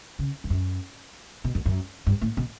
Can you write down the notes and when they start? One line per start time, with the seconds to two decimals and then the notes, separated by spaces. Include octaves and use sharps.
0.19 C#3
0.44 G2
0.50 F#2
1.44 B2
1.55 F#2
1.66 F#2
2.07 G2
2.21 A2
2.37 B2